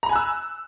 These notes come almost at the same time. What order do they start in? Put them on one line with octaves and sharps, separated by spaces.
A#5 B5 G#5 F#6 E6